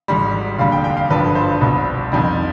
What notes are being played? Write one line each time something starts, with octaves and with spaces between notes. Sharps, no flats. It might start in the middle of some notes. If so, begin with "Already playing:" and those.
G#1 G#2 G3
F1 D#2 D3 G3 F5
G5
G5
F5
G#1 G2 D3 F3 B4
C5
C2 B2 G3
F2 D#3 G3